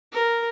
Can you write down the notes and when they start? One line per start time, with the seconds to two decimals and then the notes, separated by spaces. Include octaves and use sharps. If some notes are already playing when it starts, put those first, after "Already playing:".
0.12 A#4